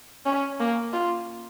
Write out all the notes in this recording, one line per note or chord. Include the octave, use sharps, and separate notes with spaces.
C#4
A#3
F4